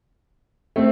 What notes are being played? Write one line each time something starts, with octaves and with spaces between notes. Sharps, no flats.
A3 C4